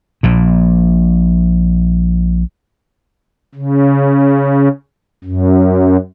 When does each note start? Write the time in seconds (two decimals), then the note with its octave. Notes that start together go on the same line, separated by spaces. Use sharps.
0.23 A#1 A#2
3.55 C#3
5.24 F#2